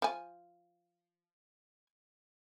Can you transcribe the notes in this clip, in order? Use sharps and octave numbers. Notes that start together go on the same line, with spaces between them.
F3 G#5